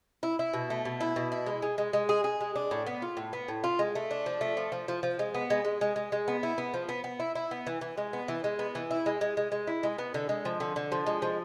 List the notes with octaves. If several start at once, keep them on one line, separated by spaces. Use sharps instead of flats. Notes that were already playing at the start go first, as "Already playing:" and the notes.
E4
E4
B2
A3
B2
E4
B2
E4
G#3
G#3
G#3
G#3
G#4
G#4
G#3
D4
A2
B3
F4
A2
B3
A2
F4
G#3
A3
D4
F3
A3
F3
F3
F3
F3
G#3
B3
G#3
G#3
G#3
G#3
G#3
B3
E4
B3
F3
B3
B3
E4
E4
B3
E3
E3
G#3
B3
E3
G#3
B3
E3
E4
G#3
G#3
G#3
G#3
E4
G#3
B3
D3
G#3
F3
D3
D3
F3
G#3
F3